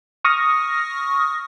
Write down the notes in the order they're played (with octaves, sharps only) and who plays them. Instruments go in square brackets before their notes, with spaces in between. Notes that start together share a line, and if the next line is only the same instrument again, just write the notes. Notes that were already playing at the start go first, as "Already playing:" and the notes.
[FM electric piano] C#6 D#6 F6 A#6